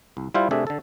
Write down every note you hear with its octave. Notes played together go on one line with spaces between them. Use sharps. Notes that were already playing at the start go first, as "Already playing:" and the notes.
C2
G3 E4 F4 C5 F5
C3 A3 D4 G#4 E5
D3 A4